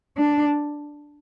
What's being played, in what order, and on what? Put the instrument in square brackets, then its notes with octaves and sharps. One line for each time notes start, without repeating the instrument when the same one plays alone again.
[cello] D4